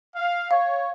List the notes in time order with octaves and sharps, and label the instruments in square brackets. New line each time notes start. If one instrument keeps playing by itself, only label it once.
[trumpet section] F5
[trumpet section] C#5 [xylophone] F5